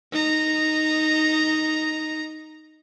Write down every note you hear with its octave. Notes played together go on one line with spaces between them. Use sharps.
D#4 A#5